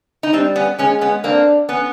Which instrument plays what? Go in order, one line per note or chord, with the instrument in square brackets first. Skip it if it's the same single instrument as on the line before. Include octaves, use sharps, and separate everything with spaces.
[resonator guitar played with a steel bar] D#4
[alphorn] G3 [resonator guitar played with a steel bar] C4 D4
[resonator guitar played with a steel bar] B3 C#4
[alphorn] G#3 [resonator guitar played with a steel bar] B3 C#4
[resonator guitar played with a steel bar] B3 C#4
[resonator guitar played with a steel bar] A#3 C4 [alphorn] D4
[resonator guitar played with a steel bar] B3 C#4